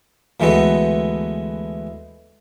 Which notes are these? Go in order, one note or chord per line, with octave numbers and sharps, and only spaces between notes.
D2 E3 G#3 A3 B3